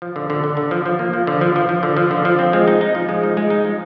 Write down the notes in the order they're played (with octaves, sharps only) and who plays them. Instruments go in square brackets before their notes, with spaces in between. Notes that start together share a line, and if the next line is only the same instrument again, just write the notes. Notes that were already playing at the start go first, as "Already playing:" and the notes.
[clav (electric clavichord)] F3
D3
D3
D3
D3
F3
F3
A#3
F3
D3
F3
F3
F3
D3
F3
D3
F3
C4
G#3
D#4
D#4
F3
G#3
D#4
G#3
D#4
F3